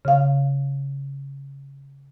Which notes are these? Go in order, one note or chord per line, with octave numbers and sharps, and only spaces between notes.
C#3 F5